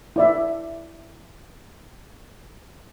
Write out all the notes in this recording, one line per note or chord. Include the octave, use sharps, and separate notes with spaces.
E4 D5 E5